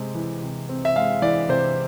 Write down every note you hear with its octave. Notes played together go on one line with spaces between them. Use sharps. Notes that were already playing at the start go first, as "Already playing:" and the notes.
Already playing: C3 G#3 C4
E3
C3
C4
E5
G#3 F5
E3 D5
C3 C5